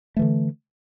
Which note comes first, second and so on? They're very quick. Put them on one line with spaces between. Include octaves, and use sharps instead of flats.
A3 E3 D3